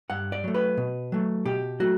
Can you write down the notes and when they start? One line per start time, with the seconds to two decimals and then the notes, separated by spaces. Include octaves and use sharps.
0.10 G2 F#5
0.32 D5
0.44 F#3 A3
0.54 B4
0.77 B2
1.12 F#3 A3
1.45 B2 G4
1.80 F#3 A3 F#4